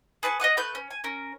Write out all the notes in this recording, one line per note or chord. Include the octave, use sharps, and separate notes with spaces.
G#4 B4 A5 C#6
D#5 F5 F#5 D#6
A3 B4 G6
C#4
G#5
C#4 A#4